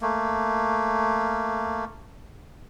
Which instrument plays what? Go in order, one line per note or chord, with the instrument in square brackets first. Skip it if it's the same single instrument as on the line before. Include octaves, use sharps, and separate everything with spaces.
[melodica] A3 A#3